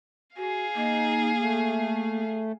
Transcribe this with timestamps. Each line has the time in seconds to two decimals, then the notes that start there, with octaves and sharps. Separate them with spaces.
0.37 F#4 G#4 F5
0.75 A#3 D#4
1.40 A3